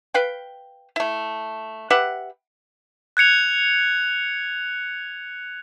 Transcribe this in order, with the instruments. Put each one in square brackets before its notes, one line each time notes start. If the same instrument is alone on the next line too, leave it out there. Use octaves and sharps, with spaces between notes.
[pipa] B4 F5 G5
A3 E4
G4 B4 E5 F#5
[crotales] F#6 G#6 C#7 F7